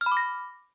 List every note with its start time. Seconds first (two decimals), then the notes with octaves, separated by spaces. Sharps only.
0.01 F6
0.06 B5
0.12 D6
0.17 A#6